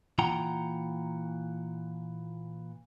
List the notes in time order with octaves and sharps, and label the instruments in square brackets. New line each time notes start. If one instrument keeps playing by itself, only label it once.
[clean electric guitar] A#2 E3 F4 F#5 G5 A#5